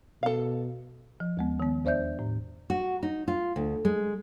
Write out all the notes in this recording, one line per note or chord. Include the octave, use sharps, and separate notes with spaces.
B2 A4 F5
F3
D#2 G#3 B3
D#3 B3
E2 C5 D5 E5 G6
A2
F#4
D#4
F4
D2
G#3